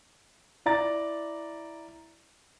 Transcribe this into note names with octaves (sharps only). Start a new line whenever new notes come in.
E4 D5 A#5 A6